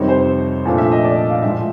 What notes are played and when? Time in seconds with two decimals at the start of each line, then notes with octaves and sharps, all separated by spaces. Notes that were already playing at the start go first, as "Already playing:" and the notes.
Already playing: F2 C3 D#3 G3 C4 C#5
0.08 C5
0.65 A#2 F3 A3 D4
0.78 E5
0.92 D#5
1.04 D5
1.30 F5
1.42 A2 F3 G#3 E5